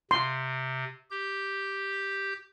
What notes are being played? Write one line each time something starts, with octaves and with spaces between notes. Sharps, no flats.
C3 C6
G4 G6